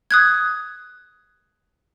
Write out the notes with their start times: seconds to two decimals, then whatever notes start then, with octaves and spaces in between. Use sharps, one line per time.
0.11 D#6 F#6 G#6